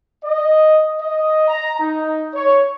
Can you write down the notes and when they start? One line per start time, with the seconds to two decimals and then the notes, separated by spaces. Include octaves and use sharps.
0.24 D#5
1.00 D#5
1.48 A#5
1.79 D#4
2.33 C#5